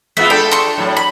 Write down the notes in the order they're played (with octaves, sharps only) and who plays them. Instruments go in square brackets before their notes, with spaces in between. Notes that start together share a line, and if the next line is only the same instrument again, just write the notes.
[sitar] G#3 B3 F4 [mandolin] E5
[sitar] D4 A4 [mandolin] G5
[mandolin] C6 C#6
[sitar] A2 F#3
[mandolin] B5